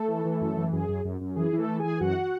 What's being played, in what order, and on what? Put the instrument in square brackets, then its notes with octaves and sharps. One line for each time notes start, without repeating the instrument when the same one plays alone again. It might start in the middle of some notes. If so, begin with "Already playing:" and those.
Already playing: [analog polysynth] A3 A4
E3
E3
F#2
E3
F#2 G#4
F#2
F#2
F#2
E3 G#4
E3
A3 A4
E3
E3 G#4 G#5
F#2 F#4 F#5